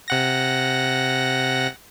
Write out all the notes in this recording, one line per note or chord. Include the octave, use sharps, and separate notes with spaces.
C3 F#5 A#6